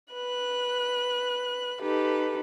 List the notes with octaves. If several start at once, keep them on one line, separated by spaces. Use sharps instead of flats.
B4 F#6
D#4 G4 A4 B4